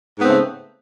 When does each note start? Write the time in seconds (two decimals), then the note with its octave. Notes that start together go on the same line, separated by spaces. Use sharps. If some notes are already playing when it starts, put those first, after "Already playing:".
0.18 G#2
0.21 B3
0.23 C4
0.26 C#3
0.29 A3